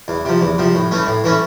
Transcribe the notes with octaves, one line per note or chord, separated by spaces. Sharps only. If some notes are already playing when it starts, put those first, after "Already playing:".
E2
C3 F3
E2
C3 F3
A2
E3 A3 C#4
A2
E3 A3 C#4